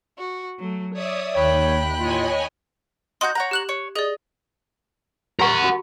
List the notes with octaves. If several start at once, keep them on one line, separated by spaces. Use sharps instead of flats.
F#4
F#3 A3
C#5 D5 E5 D#6
D#2 C#5 G5 B5 F#6
A2 F4 C#5 D#5 G#5
D#4 F#4 F#5 C6 G6
C#5 F#5 A#5
G4 F#6 F#7
C#5
G#4 D5 D#5
G4 A#4 F#5 A#5 C#6
F#4